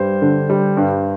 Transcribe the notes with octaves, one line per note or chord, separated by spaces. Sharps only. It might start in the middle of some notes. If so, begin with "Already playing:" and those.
Already playing: G2 G3 C5
D3
G3
G2